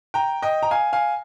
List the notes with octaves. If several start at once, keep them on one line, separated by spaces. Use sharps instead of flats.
G5 A#5
D#5 G5
A#5
F5 G#5
F5 G#5